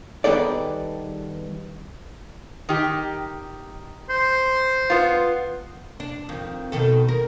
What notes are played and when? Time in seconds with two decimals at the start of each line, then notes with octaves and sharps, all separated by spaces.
0.24 D#3 G3 B3 G#4 A4 D5
2.69 D#3 G4
4.10 C5
4.90 B3 F4
6.00 D4
6.29 F2 D#3
6.72 B2 D#3 A4
7.08 A#4